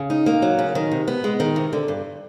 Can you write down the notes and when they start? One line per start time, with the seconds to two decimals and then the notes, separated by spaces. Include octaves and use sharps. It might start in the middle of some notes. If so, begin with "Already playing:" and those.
Already playing: C#3
0.10 D#4
0.26 A#3
0.42 F#3
0.59 C#3
0.75 D#3
0.92 C3
1.08 B3
1.24 G#3
1.40 D#3
1.56 C3
1.73 D3
1.88 G2